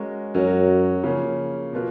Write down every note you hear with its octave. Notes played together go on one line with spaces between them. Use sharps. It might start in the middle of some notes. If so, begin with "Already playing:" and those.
Already playing: G#3 C#4 F#4 A#4
F#2 F#3 C#4 F#4 A#4
C#3 F3 A#3 C#4
B2 A#3 F4 B4